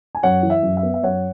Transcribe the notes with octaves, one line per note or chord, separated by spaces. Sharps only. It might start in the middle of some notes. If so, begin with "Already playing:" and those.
G#5
F#2 C#5 F#5
E3
E5
F#2
E5
B3
E5
F#2 C#5 F#5